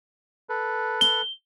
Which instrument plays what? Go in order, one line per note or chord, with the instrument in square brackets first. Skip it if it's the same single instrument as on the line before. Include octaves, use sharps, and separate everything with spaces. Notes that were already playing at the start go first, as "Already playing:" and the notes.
[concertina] A4 B4
[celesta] G7